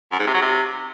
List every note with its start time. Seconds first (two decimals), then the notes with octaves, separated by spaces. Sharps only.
0.12 F#2
0.19 G#2
0.27 C3
0.34 F#3
0.42 C3